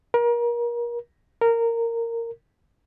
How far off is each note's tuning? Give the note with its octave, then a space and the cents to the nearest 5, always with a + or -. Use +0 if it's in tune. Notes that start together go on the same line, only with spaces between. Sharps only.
A#4 +30
A#4 -15